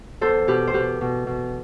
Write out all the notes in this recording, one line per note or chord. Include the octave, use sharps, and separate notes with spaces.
E2 A4 C5
B2 G4 B4
C5
B2 G4 B4
B2
B2